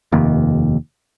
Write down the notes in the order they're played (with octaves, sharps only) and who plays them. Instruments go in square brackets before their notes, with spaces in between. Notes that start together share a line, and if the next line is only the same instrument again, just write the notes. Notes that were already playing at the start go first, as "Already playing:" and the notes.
[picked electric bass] F1 D#2